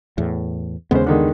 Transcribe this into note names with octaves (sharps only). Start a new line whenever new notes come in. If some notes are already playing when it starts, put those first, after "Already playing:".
E2 A2
D#2 C#3 G#3 B3 C#4 C5
D3 D#3 G#3